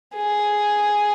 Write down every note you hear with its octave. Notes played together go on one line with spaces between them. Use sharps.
G#4